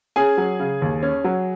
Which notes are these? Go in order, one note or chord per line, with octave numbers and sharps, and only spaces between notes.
C#4 G#4 G#5
F#3
C#3
D#2
C#4
F#3